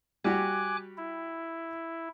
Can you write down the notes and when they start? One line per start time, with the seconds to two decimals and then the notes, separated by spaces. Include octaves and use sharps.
0.24 G3 F#4 G4 G#5 D6 F#6
0.98 E4